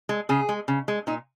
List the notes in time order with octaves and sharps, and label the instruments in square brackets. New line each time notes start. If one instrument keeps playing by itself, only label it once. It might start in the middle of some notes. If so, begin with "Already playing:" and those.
[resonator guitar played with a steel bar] G#3
C#3 G#4
G#3
C#3
G#3
A#2 D#4